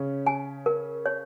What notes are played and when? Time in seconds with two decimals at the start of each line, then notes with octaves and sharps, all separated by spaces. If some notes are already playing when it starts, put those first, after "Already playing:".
Already playing: C#3 C#4
0.26 G#5
0.66 A#4
1.06 C#5